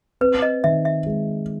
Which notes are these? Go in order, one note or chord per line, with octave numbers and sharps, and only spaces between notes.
C4 B4
D#5
D#3 E5
E5
G#3